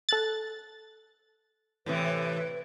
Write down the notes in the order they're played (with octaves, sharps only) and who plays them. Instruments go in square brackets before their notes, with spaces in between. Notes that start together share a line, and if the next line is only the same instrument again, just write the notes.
[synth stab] A4 F#6 A6
[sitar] A2 C3 E3 [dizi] B4